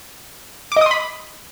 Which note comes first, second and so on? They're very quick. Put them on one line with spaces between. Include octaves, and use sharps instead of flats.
D6 D#5 D#6 C6 B5